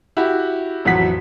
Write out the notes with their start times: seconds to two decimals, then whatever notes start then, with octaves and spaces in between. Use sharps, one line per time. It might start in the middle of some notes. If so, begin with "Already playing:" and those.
0.17 E4 F#4 G4
0.85 A1 F2 F#3 F#5 B6